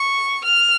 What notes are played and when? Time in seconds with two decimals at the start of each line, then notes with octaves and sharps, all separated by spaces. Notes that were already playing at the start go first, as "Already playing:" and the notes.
Already playing: C#6
0.45 F6